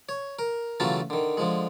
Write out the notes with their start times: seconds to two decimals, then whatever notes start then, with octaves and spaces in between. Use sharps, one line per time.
0.09 C#5
0.39 A#4
0.80 C#3 E3 F#3 A3 F4 A4
1.10 D3 D#3
1.37 D3 F3 G#3